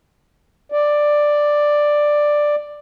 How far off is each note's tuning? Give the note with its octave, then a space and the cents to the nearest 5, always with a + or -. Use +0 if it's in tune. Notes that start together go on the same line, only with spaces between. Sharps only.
D5 +5